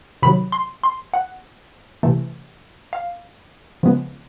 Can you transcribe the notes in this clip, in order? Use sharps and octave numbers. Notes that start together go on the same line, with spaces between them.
C3 D#3 F#3 B5
C6
C6
F#5
C3 E3 A3
F5
C#3 F3 G#3 B3